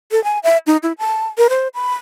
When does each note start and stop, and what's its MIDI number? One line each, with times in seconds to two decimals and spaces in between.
0.12 0.22 69
0.24 0.39 80
0.43 0.58 76
0.67 0.77 63
0.83 0.93 64
0.98 1.28 81
1.38 1.48 70
1.50 1.68 72
1.74 1.93 83